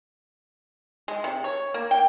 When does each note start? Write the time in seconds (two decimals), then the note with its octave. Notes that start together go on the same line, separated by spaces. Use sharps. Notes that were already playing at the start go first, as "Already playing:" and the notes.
1.08 G#3
1.24 C3
1.44 C#5
1.74 A#3
1.91 G5